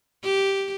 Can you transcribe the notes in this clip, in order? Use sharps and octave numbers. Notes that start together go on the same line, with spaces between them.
G4